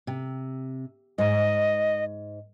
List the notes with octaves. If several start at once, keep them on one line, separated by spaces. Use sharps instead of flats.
C3
G#2 D#5